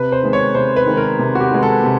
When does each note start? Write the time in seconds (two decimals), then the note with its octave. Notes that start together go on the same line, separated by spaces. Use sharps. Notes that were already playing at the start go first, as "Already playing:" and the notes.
Already playing: C3 B4
0.12 C5
0.23 D#3 G#3 B3
0.33 C#5
0.55 C3 C5
0.76 B4
0.87 D#3 G#3 B3
0.97 A#4
1.19 C3
1.35 F#4
1.40 G4
1.51 D#3 G#3 B3
1.63 A4
1.84 C3